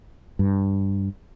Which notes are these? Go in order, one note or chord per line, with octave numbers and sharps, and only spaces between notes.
G2